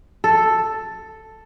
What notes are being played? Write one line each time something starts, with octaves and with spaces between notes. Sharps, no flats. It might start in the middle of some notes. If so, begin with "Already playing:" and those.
A4